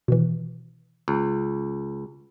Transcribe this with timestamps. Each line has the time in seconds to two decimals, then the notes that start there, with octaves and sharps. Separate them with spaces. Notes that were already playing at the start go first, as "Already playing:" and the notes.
0.08 B2 D#3 E3
1.08 C#2